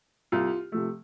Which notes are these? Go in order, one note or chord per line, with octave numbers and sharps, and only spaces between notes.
C2 F4
C3 F3 A3